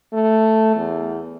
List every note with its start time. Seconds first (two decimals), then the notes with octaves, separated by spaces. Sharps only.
0.13 A3
0.76 E2